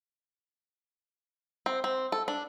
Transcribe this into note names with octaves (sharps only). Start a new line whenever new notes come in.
C4
C4
A4
D4